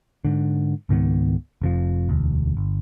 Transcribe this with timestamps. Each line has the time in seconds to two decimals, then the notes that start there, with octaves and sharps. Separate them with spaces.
0.25 G#2 D3
0.89 C#2 G#2 D#3 B3
1.62 F1 F2 F3
2.09 E1 D2
2.57 G1